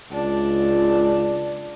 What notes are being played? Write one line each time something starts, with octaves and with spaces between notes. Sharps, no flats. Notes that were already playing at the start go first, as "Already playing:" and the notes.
C#2 D4